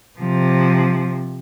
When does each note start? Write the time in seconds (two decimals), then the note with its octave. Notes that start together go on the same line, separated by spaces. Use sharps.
0.19 C3 F3